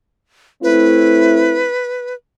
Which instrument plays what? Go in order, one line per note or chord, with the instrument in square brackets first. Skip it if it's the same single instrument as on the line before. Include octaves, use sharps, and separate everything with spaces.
[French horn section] A3 C4 E4 [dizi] B4